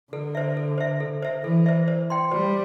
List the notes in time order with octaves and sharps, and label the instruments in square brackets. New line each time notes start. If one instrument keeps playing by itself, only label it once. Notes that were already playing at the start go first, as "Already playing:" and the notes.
[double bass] D3 [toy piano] A4
[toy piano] C5 E5
A4
C5 E5
A4
C5 E5
[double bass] E3 [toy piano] A4
[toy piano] C5 E5
C5
G5 C6
[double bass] G3 [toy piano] C5